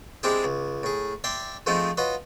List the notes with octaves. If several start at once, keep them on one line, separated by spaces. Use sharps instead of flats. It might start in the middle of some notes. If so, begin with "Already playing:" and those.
G#3 C4 D4 E4 G4 G#4
C#2
A2 G#4
D5 E5 G5 A#5 C6
F3 G#3 A3 C4 D#4 F4
F4 F#4 B4 C#5 D#5